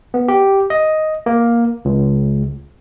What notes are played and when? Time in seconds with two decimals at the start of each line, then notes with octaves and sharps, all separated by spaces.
0.14 B3
0.28 G4
0.70 D#5
1.26 A#3
1.85 C#2